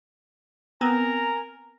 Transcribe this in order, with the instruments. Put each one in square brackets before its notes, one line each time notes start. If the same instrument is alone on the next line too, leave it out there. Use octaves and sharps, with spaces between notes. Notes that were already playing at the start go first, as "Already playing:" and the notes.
[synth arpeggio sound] B3 C4 [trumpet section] A#4 G#5 A#5